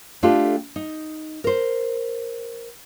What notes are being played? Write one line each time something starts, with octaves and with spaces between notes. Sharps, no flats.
A3 D4 F4 G4 A4
D#4
A#4 C5